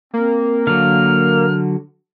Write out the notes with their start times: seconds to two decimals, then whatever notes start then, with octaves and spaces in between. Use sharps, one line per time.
0.14 A#3 C4
0.67 D3 F#3 F6